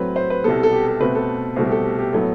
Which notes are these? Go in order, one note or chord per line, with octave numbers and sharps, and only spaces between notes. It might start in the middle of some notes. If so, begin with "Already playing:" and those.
Already playing: A2 F#3 C4 B4
C5
B4
C2 B2 G3 B3 A4
A4
G4
A4
B2 A3 C4 B4
A4
C2 B2 A3 C5
G4
A4
G4
G4
A2 F#3 B3 A4